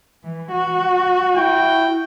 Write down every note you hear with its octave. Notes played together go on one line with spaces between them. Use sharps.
E3
F#4
E4 G5